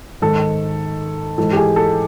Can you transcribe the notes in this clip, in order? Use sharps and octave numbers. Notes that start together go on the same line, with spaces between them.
G#2 D#3 A4
G#2 E3 A4
G4
G#4
A4